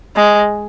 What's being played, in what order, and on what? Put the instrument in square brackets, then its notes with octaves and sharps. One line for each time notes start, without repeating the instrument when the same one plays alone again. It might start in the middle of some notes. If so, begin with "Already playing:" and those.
[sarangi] G#3